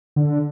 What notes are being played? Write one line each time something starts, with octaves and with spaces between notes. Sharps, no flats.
D3